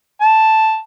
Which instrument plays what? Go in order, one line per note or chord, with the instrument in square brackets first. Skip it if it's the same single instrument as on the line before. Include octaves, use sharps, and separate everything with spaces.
[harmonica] A5